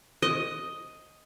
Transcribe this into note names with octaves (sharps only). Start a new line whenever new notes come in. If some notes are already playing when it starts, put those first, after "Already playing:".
D#5